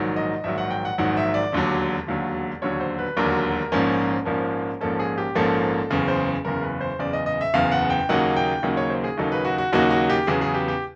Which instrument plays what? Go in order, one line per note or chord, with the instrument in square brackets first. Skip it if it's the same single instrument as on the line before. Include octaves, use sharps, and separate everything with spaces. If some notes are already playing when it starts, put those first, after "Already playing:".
Already playing: [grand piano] A#1 G#2 D#3 F#3
D#5
A#1 G#2 D#3 F#3 E5
F#5
G5
F#5
A#1 G#2 D#3 F#3 F#5
E5
D5
E1 D#2 D3 F#3
E1 D#2 D3 F#3
E1 D#2 D3 F#3 C#5
C5
B4
E1 D#2 D3 F#3 A#4
A#1 G#2 F3 A#3 C#4
A#1 G#2 F3 A#3 C#4
A#1 G#2 F3 A#3 C#4 A4
G#4
G4
A#1 G#2 F3 A#3 C#4 A4
F#1 E2 C#3
C5
F#1 E2 C#3 A#4
B4
C5
F#1 E2 C#3 D5
D#5
D#5
E5
F#1 E2 C#3 F5
F#5
G5
D#2 C#3 F#3 A#3 D#4 F#5
G5
D#2 C#3 F#3 A#3 D#4 F#5
C#5
C5
G#4
D#2 C#3 F#3 A#3 D#4 A4
B4
F#4
F#4
D#2 C#3 F#3 A#3 D#4 F#4
F#4
G4
E2 C#3 F#3 B3 G#4
G#4
G4
G4